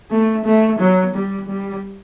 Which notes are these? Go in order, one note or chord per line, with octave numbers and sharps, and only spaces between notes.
A3
A3
F#3
G3
G3